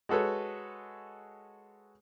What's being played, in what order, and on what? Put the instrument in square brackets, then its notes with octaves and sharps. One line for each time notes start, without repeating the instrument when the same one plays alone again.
[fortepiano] G#3 F#4 A4 B4 C#5